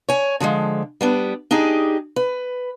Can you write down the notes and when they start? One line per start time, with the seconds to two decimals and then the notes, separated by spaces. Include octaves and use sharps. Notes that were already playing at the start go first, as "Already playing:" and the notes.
0.09 C#5 G#5
0.40 D3 F3 F#3 G#3
1.01 G3 B3 D4
1.51 D4 D#4 G4 G#4
2.16 B4